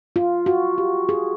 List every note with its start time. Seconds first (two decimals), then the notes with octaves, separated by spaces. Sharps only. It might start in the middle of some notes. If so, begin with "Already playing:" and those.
0.16 F4
0.46 F#4
0.78 G4
1.09 G#4